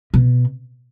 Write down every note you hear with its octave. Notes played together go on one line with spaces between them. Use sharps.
B2